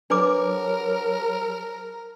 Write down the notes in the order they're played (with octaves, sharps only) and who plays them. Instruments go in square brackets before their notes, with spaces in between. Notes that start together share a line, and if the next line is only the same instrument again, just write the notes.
[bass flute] F#3 [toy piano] D4 B4 D6 [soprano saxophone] A#4